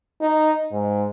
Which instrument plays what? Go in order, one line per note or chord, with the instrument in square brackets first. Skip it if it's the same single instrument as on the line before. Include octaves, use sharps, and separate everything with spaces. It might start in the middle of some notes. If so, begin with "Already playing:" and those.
[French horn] D#4
G#2